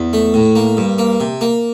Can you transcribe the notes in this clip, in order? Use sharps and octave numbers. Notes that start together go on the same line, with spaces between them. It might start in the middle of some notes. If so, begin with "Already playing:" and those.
Already playing: E2
A3
A2
A#3
G2
A#3
C3
A#3